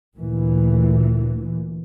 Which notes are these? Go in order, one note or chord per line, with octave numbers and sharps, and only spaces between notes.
D2 A#2 E3